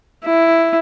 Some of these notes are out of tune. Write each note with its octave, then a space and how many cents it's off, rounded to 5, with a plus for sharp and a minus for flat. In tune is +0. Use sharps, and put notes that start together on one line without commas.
E4 +5